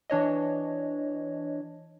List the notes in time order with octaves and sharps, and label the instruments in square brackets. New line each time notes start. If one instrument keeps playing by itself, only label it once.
[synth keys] E3 D4 C#5 D#5